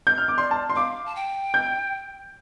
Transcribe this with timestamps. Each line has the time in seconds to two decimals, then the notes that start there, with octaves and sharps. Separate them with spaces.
0.07 G6
0.18 F6
0.28 D6
0.38 D5 C6
0.51 A5
0.70 C6
0.76 F5 D6
1.06 A5
1.16 G5
1.54 G6